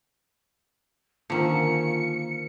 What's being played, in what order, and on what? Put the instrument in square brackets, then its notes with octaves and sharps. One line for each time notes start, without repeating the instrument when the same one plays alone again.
[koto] D3 D#3 [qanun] F3 C#4 [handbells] A#3 A#4 [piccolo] C#7